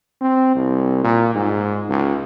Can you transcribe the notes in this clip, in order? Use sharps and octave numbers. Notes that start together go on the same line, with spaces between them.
C4
C2
A#2
G#2
C#2